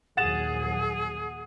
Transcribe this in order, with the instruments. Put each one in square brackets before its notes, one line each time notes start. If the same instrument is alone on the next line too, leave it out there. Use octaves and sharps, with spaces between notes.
[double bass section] A#1 D#2 F#3 [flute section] G#4 [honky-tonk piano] F#5 A6 E7